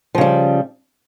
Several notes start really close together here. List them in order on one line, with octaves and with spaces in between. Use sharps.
F3 C#3 G3